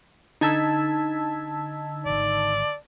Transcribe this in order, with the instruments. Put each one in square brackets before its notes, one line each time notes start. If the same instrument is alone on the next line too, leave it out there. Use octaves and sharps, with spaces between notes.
[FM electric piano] D3 A5 E6 [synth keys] D#4 G#6 B6
[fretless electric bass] D#1 G#1 [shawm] D5